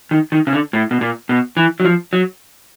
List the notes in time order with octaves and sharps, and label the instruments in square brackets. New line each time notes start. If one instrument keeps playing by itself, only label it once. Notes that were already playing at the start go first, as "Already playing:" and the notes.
[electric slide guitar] D#3
D#3
C#3
D3
A2
B2
A#2
B2
E3
F#3
F3
F#3